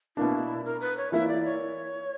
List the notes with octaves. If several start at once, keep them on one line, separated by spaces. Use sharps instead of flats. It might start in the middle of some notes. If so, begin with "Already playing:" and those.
B2 A#3 D4 E4
A#4
B4
C#5
E3 A#3 E4 E5
D5
C#5